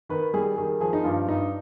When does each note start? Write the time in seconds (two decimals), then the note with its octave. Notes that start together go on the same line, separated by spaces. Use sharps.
0.09 D#3 B4
0.34 G3 G#4
0.58 D#3 G#4
0.80 F3 G#4
0.93 D#4
1.04 G2 F4
1.28 G2 D#4